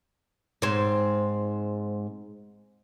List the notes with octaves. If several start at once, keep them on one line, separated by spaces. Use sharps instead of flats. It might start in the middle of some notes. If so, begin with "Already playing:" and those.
G#2 C4